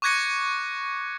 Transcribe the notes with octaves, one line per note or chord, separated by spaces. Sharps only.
C#6 D6 F#6 G#6 A#6 C#7